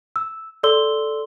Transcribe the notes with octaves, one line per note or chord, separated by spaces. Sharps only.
E6
A4 D5 C6 E6 G7